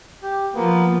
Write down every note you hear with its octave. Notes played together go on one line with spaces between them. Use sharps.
G4
F3 A#3 B3